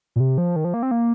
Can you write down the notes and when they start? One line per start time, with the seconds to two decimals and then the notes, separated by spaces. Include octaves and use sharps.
0.16 A#2
0.20 C3
0.38 F3
0.56 D#3
0.65 F3
0.74 A#3
0.83 C4
0.91 A#3